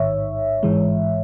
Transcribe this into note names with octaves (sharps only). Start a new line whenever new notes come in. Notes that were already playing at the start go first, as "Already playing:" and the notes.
Already playing: A1 G#2 D#3 C#5 E5
A1 G#2 E3 G#3